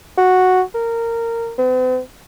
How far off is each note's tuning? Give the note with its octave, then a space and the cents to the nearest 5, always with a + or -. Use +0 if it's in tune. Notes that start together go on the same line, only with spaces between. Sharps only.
F#4 -5
A#4 -15
C4 -45